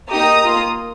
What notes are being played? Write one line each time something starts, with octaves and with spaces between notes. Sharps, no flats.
A#3 D#4 G4 A#5 D#6
A#3 F4